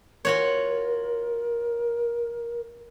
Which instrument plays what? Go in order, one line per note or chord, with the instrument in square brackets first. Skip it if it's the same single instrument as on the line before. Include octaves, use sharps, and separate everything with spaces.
[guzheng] F4 F#4 C#5 [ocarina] A#4